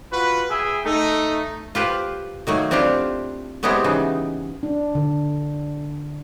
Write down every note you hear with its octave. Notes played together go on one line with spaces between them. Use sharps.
F4 F#4 B4
G#4 E5 G5 G#5
A3 D#4
F4 G4 B4 C5
D#3 F#3 A3 A#3
C4 D4 E4 F4 G4
F#3 G#3 B3 C4 E4 G4
C#3 E3 B3 D#4
D4
D3